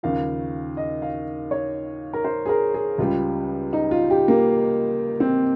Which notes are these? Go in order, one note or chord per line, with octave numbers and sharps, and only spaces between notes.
D#2 C#3 F3 F5
D#5
F5
C#5
A#4
C5
G#4
A#4
G#4
C#2 C#3 G3 F4
D#4
F4
G4
A#3
C4